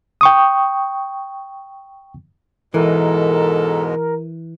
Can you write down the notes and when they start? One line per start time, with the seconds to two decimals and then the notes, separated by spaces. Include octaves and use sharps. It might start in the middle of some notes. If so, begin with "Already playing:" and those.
0.21 G5 C#6 D#6
2.74 G#2 B2 E3 G#3 A4 A#4